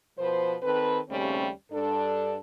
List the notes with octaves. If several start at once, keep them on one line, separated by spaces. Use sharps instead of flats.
B2 F3 B4 C5
D#3 C4 A4 B4
D#2 C#3 G3 A3 C4 C#4
G2 D4 A4